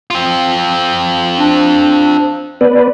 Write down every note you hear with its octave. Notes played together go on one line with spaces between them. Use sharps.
C4 F4
D4
B3 B4 D5